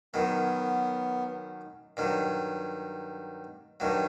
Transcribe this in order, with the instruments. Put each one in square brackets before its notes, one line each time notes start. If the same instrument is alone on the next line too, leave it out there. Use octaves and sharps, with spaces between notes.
[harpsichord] F#2 D#3 F#3 [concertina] B3
[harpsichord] G2 D#3 F#3
[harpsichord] G2 D#3 F#3 [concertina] A3